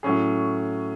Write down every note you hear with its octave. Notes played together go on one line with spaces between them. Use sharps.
A2 F#3 C#4 G#4